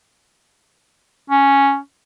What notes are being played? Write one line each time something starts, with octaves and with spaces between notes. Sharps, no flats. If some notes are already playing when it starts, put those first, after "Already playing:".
C#4